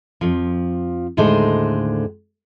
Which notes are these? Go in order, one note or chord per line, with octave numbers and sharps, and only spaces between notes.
F2 F3
D#2 A2 D3 G#3 D#4 C5